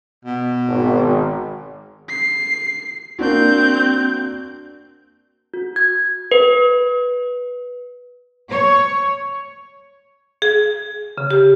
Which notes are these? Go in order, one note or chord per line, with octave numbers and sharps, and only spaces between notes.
B2
G#1
C7
A#3 C4 D4 F#4 G6
F#4
G#6
B4
C#5
G#4
C#3
G4